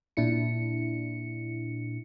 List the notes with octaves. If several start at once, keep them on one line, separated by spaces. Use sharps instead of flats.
A#2 D4 E4 C#7